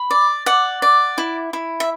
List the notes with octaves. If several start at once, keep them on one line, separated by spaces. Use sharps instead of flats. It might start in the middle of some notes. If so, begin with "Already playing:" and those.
Already playing: B5
D5
D5 F#5
D5
E4
E4
E5